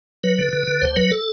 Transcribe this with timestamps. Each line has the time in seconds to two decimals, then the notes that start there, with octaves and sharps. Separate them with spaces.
0.23 F#3 B4
0.39 D3
0.53 D3
0.67 D3
0.81 D2 C5
0.96 F#3 B4
1.11 A4